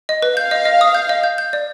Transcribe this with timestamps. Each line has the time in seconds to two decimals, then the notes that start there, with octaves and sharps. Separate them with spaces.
0.09 D#5
0.22 B4
0.37 F5 G6
0.51 D#5
0.66 D#5
0.81 D#6
0.95 G6
1.09 D#5
1.23 G6
1.38 G6
1.53 D5